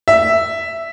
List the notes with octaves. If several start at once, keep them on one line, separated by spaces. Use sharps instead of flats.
E5